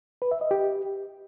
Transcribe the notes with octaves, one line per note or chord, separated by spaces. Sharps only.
B4
E5
D#5
G4